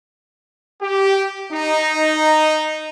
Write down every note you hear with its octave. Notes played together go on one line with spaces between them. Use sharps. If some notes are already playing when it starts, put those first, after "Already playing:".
G4
D#4